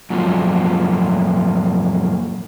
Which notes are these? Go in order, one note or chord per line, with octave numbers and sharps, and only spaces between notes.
F#2 A#2 F3